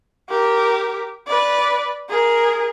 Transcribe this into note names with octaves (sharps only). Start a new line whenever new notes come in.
G4 A#4
B4 D5
G#4 A#4